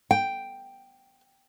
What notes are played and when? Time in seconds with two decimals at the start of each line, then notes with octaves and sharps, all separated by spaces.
0.11 G5